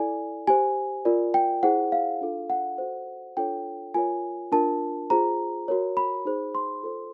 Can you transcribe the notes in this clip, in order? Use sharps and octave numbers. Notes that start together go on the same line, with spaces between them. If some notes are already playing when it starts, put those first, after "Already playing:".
Already playing: E4 A4 D5 G#5
G4 C5 G#5
F4 A#4 D5
G5
E4 G#4 C5 F#5
F5
D4 F4 A4
F#5
F#4 A4 C5
D4 F4 A4 C#5 G5
F4 A#4 C#5 G#5
D4 F4 A#4 A5
F4 G#4 C5 A#5
F#4 A#4 C#5
B5
D#4 G#4 C5
C6
F4 A4 C5